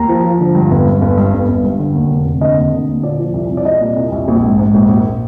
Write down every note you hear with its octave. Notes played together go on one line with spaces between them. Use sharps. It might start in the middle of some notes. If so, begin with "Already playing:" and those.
Already playing: D#2 A#5
F3
F3
D3
G2
G1
G2
G1
G2
G1
G1
G2
D3
D#2
F1
F1
D3 D#5
D#2
D3
D#2
A#2 D5
F3
C2
C2
D5
C2 D#5
A#2
C2
C2
A#1
G#2
G#2
A#1
A#1